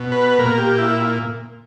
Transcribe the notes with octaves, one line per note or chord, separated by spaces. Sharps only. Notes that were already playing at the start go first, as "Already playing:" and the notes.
Already playing: B2
B4
A#2 A#4
G4
E4